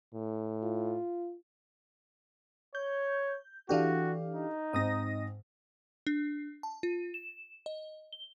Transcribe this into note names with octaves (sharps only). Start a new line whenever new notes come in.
A2
F4
C#5 G6
E3 D4 F#4 G4 A4 F5
D#4
G#2 C4 D#5 D#6 A#6
D4
A5
F4
E7
D#5
G7